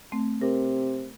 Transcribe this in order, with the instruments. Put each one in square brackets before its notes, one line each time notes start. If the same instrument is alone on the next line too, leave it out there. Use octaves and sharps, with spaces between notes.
[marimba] A3 C4
[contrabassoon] C3 [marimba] A#4